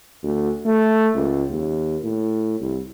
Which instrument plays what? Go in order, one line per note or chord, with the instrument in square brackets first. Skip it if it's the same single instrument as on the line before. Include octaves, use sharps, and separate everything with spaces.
[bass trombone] D2
A3
C#2
D#2
A2
C2